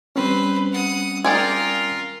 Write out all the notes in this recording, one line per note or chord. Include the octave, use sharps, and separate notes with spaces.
G3 C4 C#4 B4 C5
F#5 D#6
F4 G#4 A#4 D5 G5